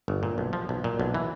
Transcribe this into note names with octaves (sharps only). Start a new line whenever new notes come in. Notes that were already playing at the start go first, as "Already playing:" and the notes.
G1
A#2
B1
F3
B1
A#2
B1
E3